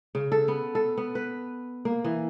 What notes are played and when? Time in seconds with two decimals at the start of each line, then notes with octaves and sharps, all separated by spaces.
0.15 C#3
0.32 A4
0.48 B3
0.75 A4
0.98 B3
1.15 B4
1.85 A#3
2.04 E3